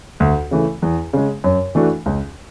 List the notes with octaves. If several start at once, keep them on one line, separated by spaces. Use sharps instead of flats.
D2
C#3 E3 A3
E2
C#3 G#3
F#2
E3 A3 D4 F#4
C#2